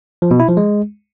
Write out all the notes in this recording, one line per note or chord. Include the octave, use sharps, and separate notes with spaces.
F3
B2
E4
F3
G#3